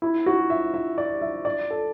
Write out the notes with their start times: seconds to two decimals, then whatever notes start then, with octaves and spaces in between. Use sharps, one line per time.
0.02 E4
0.26 F#4
0.50 E5
0.74 E5
0.98 D5
1.21 E5
1.45 D5
1.70 A4